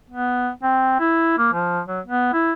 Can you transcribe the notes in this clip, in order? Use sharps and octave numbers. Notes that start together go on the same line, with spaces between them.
B3
C4
E4
A#3
F3
F#3
B3
E4